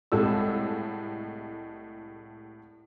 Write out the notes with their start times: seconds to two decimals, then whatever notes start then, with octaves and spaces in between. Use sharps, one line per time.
0.12 C2 A2 G#3 A4 E6